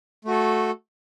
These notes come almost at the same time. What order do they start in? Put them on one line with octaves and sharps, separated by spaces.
A3 F#4 A4